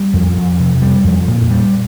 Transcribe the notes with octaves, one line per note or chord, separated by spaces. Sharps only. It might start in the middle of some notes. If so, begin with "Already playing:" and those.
Already playing: G3
F2
F2
C3
G3
F2
A#2
G3